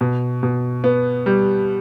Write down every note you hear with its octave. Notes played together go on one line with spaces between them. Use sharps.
B2
B2
B3
G3